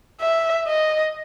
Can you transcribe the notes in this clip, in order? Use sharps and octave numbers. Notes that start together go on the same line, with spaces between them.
E5
D#5